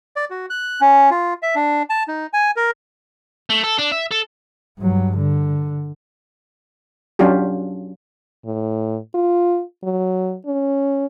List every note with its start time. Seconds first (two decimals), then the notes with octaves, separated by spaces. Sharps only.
0.16 D5
0.30 F#4
0.50 F#6
0.81 C#4
1.11 F4
1.43 E5
1.55 D4
1.90 A5
2.08 D#4
2.33 G#5
2.56 A#4
3.50 A3
3.64 A4
3.78 D4
3.92 E5
4.11 A4
4.79 G2 F#3
5.17 D3
7.19 F#3 C#4 D4 F4 G4
8.45 A2
9.15 F4
9.83 F#3
10.46 C#4